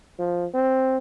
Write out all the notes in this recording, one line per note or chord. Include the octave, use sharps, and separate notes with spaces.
F3
C4